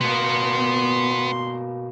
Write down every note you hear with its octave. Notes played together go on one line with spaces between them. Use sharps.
B2 A#3 B3 C6